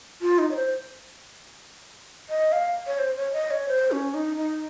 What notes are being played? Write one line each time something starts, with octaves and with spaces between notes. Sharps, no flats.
F4
D#4
C#5
C5
D#5
F5
C#5
C5
C#5
D#5
C#5
C5
C#4
D#4
D#4